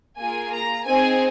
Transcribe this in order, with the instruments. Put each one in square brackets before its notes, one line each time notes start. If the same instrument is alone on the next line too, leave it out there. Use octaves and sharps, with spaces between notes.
[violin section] A#3 F4 G#4 G#5
A#5
C4 D#4 G#4 G#5